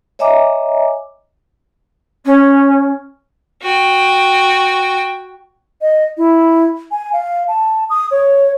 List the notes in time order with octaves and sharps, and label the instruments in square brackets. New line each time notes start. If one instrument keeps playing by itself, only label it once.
[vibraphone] C#5 D#5 E5 G#5 A#5 D6
[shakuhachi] C#4
[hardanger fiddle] F#4 G5
[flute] D#5
E4
G#5
F5
A5
D#6
C#5